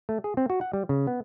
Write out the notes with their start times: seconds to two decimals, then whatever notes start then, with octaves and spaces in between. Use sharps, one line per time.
0.09 A3
0.24 G#4
0.37 C4
0.50 F#4
0.61 F#5
0.73 G3
0.89 C#3
1.07 B3